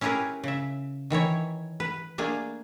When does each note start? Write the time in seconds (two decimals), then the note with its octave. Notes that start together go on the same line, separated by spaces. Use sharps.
0.01 C#4 E4 G4 G#4 A#4 B4
0.44 C#3 E5
1.10 D#3 E3 E4 C#5
1.80 B4
2.18 A3 A#3 D4 G#4